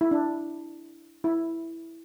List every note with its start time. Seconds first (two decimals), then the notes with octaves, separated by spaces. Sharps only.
0.01 E4
0.11 D4
1.24 E4